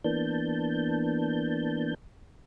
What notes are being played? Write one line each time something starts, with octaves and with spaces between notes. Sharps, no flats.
E3 A#3 B3 D4 A5 G6